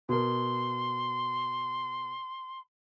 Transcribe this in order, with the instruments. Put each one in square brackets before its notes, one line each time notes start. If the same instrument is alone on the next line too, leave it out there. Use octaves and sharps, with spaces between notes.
[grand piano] B2 A#4 [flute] C6